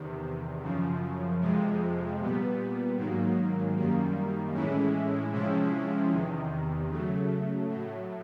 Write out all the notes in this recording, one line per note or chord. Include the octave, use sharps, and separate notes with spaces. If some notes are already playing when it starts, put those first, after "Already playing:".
Already playing: E2 C3 D#3
F#2 C#3 F3
F2 C3 F3 G#3
A#2 G3 B3
G#2 D#3 F#3 A#3
F#2 D#3 G3 A#3
A2 E3 G#3 C#4 E4
C3 F3 G#3 C#4 E4
E2 C3 D#3
C#3 F#3 A3
A2 F#3 A3